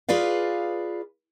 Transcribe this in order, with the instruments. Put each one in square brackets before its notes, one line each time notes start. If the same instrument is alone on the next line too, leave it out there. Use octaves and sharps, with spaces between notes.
[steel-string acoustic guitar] F4 G#4 B4 D5 F5